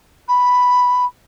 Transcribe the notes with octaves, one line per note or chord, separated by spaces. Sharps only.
B5